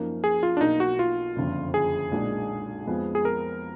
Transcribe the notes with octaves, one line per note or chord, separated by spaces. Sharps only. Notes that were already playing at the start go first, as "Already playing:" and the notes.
Already playing: F#2 F3 A#3 D#4
G#4
F4
D4
B1 B2 A#3 D#4
F#4
F4
F#1 F2 D3 F3
G#4
B1 A#2 G#3 D4
F2 F3 G#3 B3
G#4
A#4